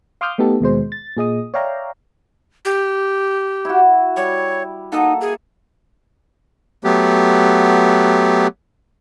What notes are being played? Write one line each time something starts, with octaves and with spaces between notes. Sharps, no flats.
F5 C6 D6 D#6 F6 G6
A3 B3 D#4 G4 A4
D#2 B2 G#3 C5
A6
A#2 G#4 D#5 D#6
C#5 D5 E5 F5 G5 A#5
G4
E4 F#4
G3 C#5
A#3 D#4 A4 F#5
G#4
F#3 A3 B3 G4